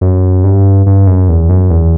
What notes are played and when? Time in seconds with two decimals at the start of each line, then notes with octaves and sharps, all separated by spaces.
0.01 F#2
0.44 G2
0.86 G2
1.07 F#2
1.29 E2
1.50 F#2
1.70 E2